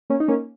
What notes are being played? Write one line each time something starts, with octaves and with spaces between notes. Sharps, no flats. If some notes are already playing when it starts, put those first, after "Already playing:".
A#3 C#4
D#4
A#3 C#4